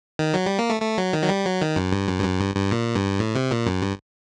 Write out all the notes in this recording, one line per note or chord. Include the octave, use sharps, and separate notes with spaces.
D#3
F#3
G3
A#3
A3
A3
F#3
D#3
F#3
G3
F#3
D#3
F#2
G2
F#2
G2
F#2
G2
G2
A#2
G2
A2
C3
A#2
F#2
G2